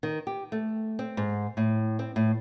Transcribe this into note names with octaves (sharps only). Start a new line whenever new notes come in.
D#3
G4
A3
C4
G#2
A2
C4
A2